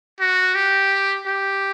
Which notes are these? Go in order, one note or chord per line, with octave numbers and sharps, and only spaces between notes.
F#4
G4
G4